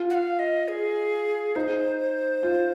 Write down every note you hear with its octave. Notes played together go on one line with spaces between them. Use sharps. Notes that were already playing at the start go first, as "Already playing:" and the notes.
Already playing: F4
F#5
F5
D#5
G#4
D#4 C5
F4